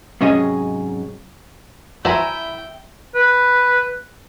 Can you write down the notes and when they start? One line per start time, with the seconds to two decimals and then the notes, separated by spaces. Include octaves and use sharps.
0.21 G#2 C3 F#3 C#4 G#4 D#5
2.05 E4 F#4 C5 E5 G5 G#5 A#5
3.15 B4